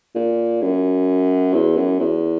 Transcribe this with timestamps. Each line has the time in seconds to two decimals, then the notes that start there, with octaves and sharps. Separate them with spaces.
0.15 A#2
0.62 F#2
1.54 E2
1.76 F#2
2.00 E2